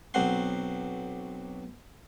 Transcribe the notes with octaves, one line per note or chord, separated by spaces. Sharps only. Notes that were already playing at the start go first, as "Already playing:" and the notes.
B1 F#3 C4 F#5 C6